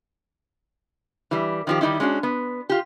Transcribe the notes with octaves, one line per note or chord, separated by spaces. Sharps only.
E3 G3
D#3 F3 G4
D#3 G3 A3 D#4 E4
G#3 C#4 D4 F#4
B3
F4 G4